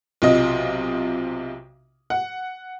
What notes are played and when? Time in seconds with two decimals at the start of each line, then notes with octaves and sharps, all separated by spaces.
0.22 B1 C3 F4 D#5
2.10 F#5